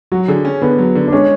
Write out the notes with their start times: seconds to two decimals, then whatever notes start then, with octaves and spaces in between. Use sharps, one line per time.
0.12 F#3 F#4
0.28 D3 G#4
0.45 C#4
0.61 D3 B3
0.78 F#3
0.95 D3
1.08 D4
1.12 G#3 C#4